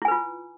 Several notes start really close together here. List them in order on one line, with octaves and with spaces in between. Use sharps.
E4 G#5 B4 F4